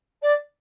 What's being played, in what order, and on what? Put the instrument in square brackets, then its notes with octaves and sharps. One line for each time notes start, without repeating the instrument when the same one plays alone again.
[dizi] D5